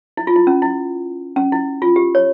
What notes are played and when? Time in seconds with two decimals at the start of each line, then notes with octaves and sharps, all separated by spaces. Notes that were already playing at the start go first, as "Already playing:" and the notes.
0.17 E4
0.27 F4
0.36 E4
0.47 C#4
0.62 E4
1.36 C#4
1.52 E4
1.82 F4
1.96 G4
2.15 C#5